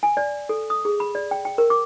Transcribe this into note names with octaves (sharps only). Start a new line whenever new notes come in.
G#5
D5
A4
D#6
G#4
B5
D5
G5
G5
A#4
D6